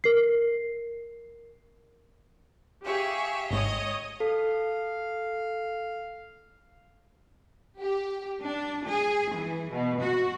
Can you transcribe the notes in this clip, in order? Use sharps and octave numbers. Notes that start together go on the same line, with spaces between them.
A#4 C7
G4 G#4 E5 F5 C#6
G#1 G#2 C#5 D#5 D#6
A4 F5
G4
D4
G#4
E3
B2
F#4